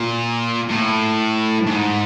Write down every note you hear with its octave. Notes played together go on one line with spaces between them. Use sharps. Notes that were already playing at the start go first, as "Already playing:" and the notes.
Already playing: A#2
A2
G#2